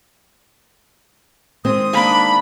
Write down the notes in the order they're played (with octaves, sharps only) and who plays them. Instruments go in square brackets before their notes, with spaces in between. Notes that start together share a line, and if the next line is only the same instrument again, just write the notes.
[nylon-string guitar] D#3 G#3 C4 [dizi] D#6
[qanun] A#3 D4 [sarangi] B5